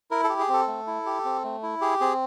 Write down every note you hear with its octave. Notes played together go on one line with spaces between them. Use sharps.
E4 A#4
A4
G4
G#4
C4 A4
A3
E4
G4
C4
A3
E4
G4 G#4
C4 G#4